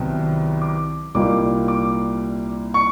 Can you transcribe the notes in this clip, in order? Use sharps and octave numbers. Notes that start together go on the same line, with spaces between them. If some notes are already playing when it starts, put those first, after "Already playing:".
Already playing: C2 C3 D#3 F#3 B3
D6
C2 A#2 G3 A#3 D#4 D6
D6
C#6